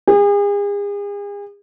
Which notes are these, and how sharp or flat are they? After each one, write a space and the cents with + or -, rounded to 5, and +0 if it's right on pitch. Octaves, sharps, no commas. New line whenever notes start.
G#4 -40